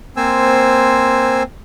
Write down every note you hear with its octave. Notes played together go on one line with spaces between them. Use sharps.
A#3 C4 C5 G#5 E6